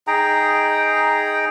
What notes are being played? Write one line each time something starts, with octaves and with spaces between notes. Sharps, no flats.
D#4 G#4 G5 A#5